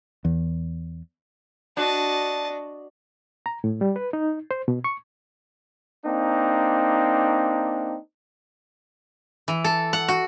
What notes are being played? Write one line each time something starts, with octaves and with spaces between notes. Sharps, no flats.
E2
D4 F#4 D#5 A5
A#5
A2
G3
B4
D#4
C5
B2
C#6
A#3 C4 D4 D#4
E3
A4
F#5
F#4